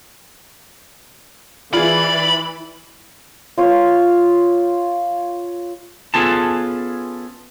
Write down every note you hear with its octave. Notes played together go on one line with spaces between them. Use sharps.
E3 F4 G#4 D5 B5
F4 C#5
B3 C#4 F4 G#4 A4 A5